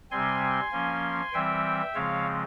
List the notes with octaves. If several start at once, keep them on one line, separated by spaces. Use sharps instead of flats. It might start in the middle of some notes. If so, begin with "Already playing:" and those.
C3 G3 C4 G#5 C6
F3 A#3 C#4
E3 G3 C4 E5 G5
C#3 F3 G#3 C4 C#5 F5